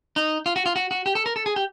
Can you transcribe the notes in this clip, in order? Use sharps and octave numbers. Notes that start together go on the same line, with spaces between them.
D#4
F4
F#4
F4
F#4
F#4
G4
A4
A#4
A4
G#4
G4